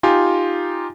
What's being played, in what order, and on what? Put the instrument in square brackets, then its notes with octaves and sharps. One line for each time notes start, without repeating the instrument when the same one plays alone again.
[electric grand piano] D#4 F4 G4 G#5